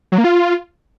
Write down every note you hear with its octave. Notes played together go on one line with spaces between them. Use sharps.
F#3
A#3
F4